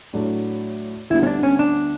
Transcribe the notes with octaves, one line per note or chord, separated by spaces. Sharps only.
A2 F#3 A3 D4
D2 D3 G3 B3 E4
C#4
D4
C#4
D4